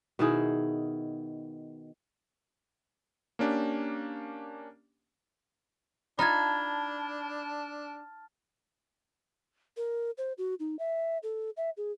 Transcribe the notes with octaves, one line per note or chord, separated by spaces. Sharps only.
B2 D#3 E4 G#4
A#3 C#4 D4 G4
D4 D#4 F4 A5 B5 F6 G#6 A6
A#4
C5
F#4
D#4
E5
A4
E5
G#4